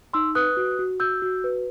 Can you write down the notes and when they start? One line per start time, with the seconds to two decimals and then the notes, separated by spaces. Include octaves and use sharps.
0.14 D#4 C6 E6
0.35 B4 D#6 F#6
0.57 F#4
0.79 F#4
1.00 F#4 E6 G6
1.22 F#4
1.44 B4